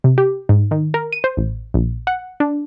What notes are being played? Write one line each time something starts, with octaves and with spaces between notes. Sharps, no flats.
C3
G4
G#2
D#3
A#4
D#7
C5
A1
A#1
F#5
D4